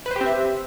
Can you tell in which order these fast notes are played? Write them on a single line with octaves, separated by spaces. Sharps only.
B4 C5 G4 C4 E5